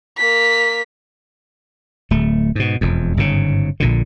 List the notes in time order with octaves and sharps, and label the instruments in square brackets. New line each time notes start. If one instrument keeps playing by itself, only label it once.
[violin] A#3 B6
[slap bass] D1 A3
G#2 B2
E1 F2
G1 G#2 C#3
A#1 A#2 D3